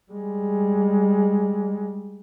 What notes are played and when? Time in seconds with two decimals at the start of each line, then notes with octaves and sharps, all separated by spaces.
0.12 G3 G#3